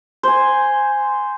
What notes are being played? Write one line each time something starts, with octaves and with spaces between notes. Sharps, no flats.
C5 G#5